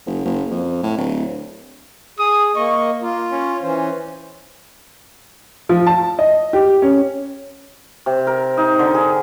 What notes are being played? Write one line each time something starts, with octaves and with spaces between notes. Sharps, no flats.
F#1
F#1
F2
A2
D1
G#4 D#6
A#3 D#5 C#6
A#3 F4
C#4
E3 C#4 C5
F3
A5
D#5
G4
C#4
C3
A#4
D#4
D3
G#4